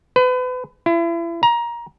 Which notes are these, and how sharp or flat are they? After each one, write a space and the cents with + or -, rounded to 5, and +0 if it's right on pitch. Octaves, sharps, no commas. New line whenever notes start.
B4 +35
E4 +35
A#5 +20